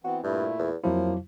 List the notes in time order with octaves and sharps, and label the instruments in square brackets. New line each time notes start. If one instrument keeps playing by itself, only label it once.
[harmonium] E3 B3 C4 [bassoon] F#4
[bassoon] G2 [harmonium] A#2 A3 E4
[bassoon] E2
[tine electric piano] F2 F#3 E4 [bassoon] F3 [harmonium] A#3